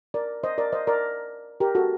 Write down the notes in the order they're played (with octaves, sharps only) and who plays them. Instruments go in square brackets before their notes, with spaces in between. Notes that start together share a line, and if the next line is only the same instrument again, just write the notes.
[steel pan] A#4 D5
C5 D#5
A#4 D5
C5 D#5
A#4 D5
G4 A#4
F#4 A4